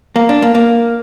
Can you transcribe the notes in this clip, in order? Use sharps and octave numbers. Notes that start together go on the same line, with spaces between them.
A#3
D4
A#3
A#3